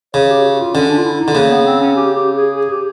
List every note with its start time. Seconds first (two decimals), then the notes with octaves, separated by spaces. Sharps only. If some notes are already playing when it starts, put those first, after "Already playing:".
0.14 C#3 C#5
0.30 G4
0.44 F#4
0.60 F4
0.74 D3 C#4
0.90 D4
0.98 F4
1.04 E4
1.20 D#4
1.28 D3
1.35 C#3 A#3
1.50 B3
1.66 C4
1.80 C#4
1.96 G4
2.15 G4
2.37 G#4
2.56 G#4
2.71 G4